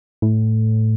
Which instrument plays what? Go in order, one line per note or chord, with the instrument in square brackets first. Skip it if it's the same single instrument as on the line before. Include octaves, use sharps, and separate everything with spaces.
[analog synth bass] A2